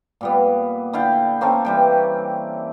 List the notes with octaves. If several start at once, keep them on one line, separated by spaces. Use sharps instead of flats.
A#2 G3 B3
D3 E4 F5 G5
A#3 C4 C#4 A4
E3 G3 G5